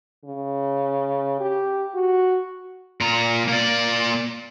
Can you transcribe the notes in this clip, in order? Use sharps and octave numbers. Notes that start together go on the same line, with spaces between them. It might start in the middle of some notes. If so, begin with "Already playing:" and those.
C#3
G4
F#4
A#2 A#5
A#3 D5